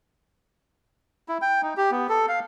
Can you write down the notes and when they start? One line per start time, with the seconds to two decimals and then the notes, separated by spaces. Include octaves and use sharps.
1.29 E4
1.42 G5
1.62 D#4
1.77 G4
1.91 B3
2.09 A4
2.28 F5